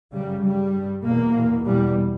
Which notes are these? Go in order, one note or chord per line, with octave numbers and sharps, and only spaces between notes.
F#2 C#3 G3
G2 G3
G2
E2 B2 A#3
E2 B2
E2 B2 G3